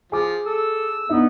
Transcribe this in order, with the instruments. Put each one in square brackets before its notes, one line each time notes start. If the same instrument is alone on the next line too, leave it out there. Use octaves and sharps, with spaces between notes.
[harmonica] F3 [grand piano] G#4 D6
[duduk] A4 [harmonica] E6
[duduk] B3 [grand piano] D4 D#4 E5